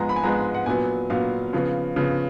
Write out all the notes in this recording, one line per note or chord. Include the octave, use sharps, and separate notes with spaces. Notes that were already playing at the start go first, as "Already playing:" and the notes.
Already playing: G#2 F3 G#3 B3 G#5 A#5
B5
G#5
G#2 F3 G#3 B3 A#5
F#5
A#2 F#3 B3 G#5
A#2 F#3 B3 F5
C#3 F3 B3
C#3 F3 B3